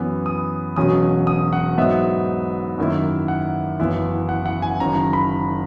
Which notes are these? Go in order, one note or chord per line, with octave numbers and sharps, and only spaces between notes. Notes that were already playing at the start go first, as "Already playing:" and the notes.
Already playing: F#2 E3 B3
D#6
E1 E2 B2 F#3 C#4 D#6
D#6
F#5
G#2 F#3 B3 D#4 E5
F#2 D#3 A#3 E4
F#5
F#1 F#2 E3 B3 E4
F#5
F#5
G#5
F#1 F#2 D#3 A#5
A#5
B5